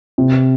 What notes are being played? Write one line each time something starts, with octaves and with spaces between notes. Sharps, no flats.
C3